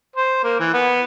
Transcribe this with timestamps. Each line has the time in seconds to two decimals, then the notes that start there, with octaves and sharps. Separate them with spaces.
0.16 C5
0.44 A#3
0.60 E3
0.73 B3